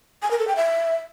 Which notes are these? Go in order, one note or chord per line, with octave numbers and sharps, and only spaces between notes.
G#5
A#4
A4
G5
E5